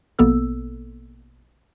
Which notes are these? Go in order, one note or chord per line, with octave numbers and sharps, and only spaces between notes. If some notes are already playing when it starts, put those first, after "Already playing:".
A#1 B2 A#3 B3 A4 E6